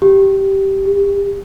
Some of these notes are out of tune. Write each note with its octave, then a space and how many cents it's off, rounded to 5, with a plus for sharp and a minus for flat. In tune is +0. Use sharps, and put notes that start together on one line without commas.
G4 -10
G4 +30